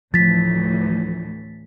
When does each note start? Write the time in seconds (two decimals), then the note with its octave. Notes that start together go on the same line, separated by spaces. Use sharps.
0.14 D2 A2 E3 F3 A6 B6